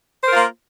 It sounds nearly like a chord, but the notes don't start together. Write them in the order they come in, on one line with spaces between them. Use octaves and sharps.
C5 A#4 F4 A#3